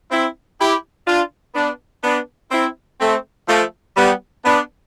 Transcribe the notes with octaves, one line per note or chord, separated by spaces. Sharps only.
C4 E4
E4 G4
D4 F4
B3 D4
B3 D4
C4 E4
A3 C4
F3 A3
G3 B3
B3 D4